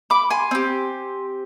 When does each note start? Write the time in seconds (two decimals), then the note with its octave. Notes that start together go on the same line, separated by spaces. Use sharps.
0.10 B5 D6
0.30 G#5 C6
0.51 C4 G4